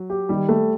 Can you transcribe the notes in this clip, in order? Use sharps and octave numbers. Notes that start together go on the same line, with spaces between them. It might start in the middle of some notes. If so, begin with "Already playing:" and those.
Already playing: F#3
G4
D#3 G3
A3